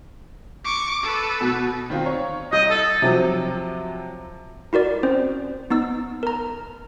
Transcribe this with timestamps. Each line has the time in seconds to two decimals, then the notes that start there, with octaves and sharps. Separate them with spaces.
0.65 C#6 D6
1.03 A4 B4
1.41 B2
1.90 D#3 C4 F4
2.06 C#5
2.52 C2 D#5 D#6 G6
2.70 A4
3.02 C3 F3 F#3
4.73 E4 F#4 A#4 D5
5.03 C4 C#4 C5
5.70 B3 D#4 E6
6.23 A#4 A#5